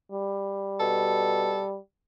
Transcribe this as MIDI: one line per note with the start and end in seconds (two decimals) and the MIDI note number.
0.12 1.77 55
0.80 1.59 47
0.80 1.65 69